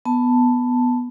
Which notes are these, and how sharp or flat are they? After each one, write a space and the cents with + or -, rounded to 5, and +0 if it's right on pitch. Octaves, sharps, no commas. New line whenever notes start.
B3 +0 A5 +0